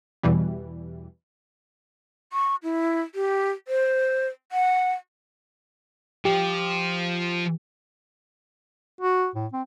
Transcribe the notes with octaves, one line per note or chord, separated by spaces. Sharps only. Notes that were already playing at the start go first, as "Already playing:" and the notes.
E2 B2 E3 G3
C#6
E4
G4
C5
F#5
F3 G4
F#4
A2
C4